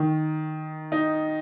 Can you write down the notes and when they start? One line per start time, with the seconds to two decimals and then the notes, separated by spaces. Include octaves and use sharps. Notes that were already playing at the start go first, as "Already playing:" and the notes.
Already playing: D#3
0.92 D#4